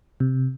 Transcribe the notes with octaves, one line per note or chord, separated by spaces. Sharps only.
C3